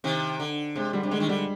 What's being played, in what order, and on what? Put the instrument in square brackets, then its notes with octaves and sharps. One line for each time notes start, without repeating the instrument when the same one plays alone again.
[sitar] C3 D#3
D3
[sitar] C3 [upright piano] G#3
[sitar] D3 [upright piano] G3
[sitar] C3
[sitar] D3 [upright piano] G#3
[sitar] D#3
[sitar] D3 [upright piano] G3